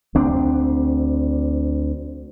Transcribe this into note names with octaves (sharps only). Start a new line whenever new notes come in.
D2 C4 D4